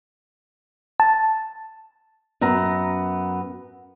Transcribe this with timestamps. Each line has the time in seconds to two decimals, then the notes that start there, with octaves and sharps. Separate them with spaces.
1.00 A5
2.41 F#2 B3 A#5